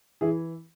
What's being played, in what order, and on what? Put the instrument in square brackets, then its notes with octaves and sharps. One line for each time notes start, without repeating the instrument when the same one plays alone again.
[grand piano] E3 E4 G#4